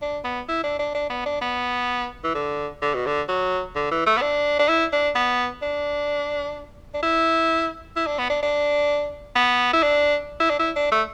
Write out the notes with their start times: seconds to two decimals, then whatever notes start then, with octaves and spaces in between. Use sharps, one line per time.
0.02 D4
0.24 B3
0.48 E4
0.64 D4
0.79 D4
0.94 D4
1.10 B3
1.26 D4
1.41 B3
2.24 E3
2.34 D3
2.82 D3
2.94 B2
3.06 D3
3.28 F#3
3.76 D3
3.91 E3
4.06 A3
4.18 B3
4.21 D4
4.59 D4
4.69 E4
4.93 D4
5.15 B3
5.62 D4
6.94 D4
7.03 E4
7.96 E4
8.07 D4
8.18 B3
8.30 D4
8.43 D4
9.35 B3
9.73 E4
9.83 D4
10.40 E4
10.50 D4
10.59 E4
10.76 D4
10.91 A3